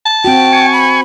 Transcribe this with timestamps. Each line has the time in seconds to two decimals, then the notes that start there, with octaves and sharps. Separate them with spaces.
0.06 A5
0.25 C4 F#4 G5
0.53 G#5 C#6
0.73 B5